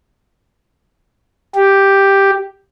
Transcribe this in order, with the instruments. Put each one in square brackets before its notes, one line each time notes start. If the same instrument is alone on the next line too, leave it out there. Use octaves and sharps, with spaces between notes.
[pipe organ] G4